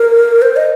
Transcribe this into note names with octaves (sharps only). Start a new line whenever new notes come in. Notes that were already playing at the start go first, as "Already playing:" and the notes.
Already playing: A#4
C5
D#5